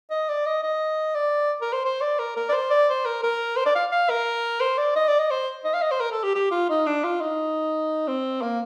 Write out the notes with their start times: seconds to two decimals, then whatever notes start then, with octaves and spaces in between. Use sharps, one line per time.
0.10 D#5
0.29 D5
0.46 D#5
0.63 D#5
1.15 D5
1.61 A#4
1.72 C5
1.85 C5
2.01 D5
2.19 A#4
2.36 A#4
2.49 D5
2.53 C5
2.70 D5
2.88 C5
3.06 A#4
3.23 A#4
3.57 C5
3.66 D5
3.75 F5
3.91 F5
4.10 A#4
4.60 C5
4.78 D5
4.95 D#5
5.08 D5
5.19 D#5
5.30 C5
5.64 D#5
5.74 F5
5.82 D#5
5.91 C5
6.00 A#4
6.12 A4
6.23 G4
6.35 G4
6.51 F4
6.69 D#4
6.86 D4
7.04 F4
7.20 D#4
8.07 C4
8.41 A#3